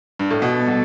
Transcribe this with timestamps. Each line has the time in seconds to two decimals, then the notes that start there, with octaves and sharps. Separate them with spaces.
0.19 G2
0.30 A2
0.41 B2 G3 B3 F#4 A4
0.68 B2